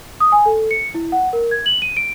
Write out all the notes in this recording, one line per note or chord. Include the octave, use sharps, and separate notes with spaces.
D#6
G#5
A4
C#7
E4
F#5
A#4
G#6
F#7
D#7
D7